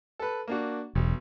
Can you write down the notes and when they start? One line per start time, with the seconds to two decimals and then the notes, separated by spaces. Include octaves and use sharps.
0.19 A4 B4
0.48 A#3 D4 F#4
0.95 E1 B1